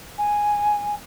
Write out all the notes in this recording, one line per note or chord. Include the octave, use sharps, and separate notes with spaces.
G#5